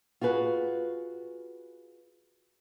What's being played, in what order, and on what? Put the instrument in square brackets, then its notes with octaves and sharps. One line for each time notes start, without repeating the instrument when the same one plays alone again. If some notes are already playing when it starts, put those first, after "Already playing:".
[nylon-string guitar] F4 F#4 G#4 B4